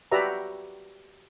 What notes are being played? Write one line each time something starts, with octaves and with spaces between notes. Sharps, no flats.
F#4 G4 B4 D5 E5 A#5